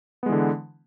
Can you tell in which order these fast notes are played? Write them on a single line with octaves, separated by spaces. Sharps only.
B3 G#3 E3 D3